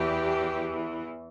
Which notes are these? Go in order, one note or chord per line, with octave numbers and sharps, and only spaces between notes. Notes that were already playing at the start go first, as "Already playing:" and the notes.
Already playing: E2 E3 G4